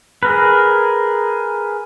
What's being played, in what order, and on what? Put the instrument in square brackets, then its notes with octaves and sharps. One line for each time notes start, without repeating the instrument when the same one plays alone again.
[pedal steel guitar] G#4 A#4 B4